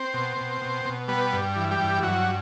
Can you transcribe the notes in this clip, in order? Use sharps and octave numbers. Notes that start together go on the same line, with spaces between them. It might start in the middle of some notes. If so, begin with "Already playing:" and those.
Already playing: C4 C5
B2
B2
B2
B2
G3 B3 B4
G2
E3
G3 G4
G2
G2 F#3 F#4